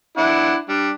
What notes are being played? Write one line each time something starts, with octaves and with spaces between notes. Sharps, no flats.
D4 E4 F#5
G3 D4